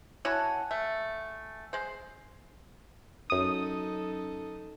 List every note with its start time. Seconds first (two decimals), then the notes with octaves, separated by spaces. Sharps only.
0.25 E4 F#4 C#5 F#5 G#5 A5
0.71 A3
1.73 G#3 C5
3.30 F#2 D#4 A4 D#6